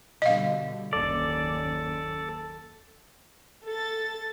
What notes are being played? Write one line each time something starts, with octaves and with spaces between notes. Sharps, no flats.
B2 D3 G3 D#5 F5
F#1 D#2 C#4 A4 D5
A4 A6